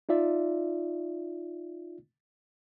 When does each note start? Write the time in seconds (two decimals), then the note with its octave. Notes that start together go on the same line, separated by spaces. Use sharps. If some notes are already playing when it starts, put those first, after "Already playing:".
0.09 D#4 F4 D5 E5